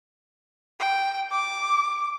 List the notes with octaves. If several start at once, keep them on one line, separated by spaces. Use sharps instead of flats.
G5
D6